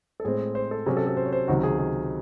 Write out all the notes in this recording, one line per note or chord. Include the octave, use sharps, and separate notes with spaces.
A4
A2 G#3 C4 G#4
C5
A4
C3 F#3 C#4 G#4
A4
A4
C5
C#5
C5
C#2 C3 D#3 F#3 F#4
G#4
G#4